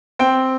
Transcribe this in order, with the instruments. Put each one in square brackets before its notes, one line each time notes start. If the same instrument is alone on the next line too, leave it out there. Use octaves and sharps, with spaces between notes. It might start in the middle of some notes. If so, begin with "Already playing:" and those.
[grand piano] C4 G5